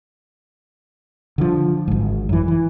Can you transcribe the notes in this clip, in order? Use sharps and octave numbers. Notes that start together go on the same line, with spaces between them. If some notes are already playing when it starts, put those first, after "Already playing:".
D3 D#3 F3
G#1 G#2
F#2 E3
E3